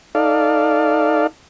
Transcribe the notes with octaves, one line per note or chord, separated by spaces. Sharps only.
D#4 A4 D5 F5